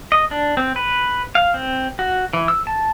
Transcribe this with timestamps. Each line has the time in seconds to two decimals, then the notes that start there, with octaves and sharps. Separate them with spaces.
0.12 D#5
0.31 D4
0.57 C4
0.76 B4
1.35 F5
1.54 C4
1.99 F#4
2.33 E3
2.48 E6
2.67 A5